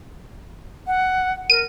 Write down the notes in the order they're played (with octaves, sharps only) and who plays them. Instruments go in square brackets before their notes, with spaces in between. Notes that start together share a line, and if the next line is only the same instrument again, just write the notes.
[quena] F#5
[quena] A#4 [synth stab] D#7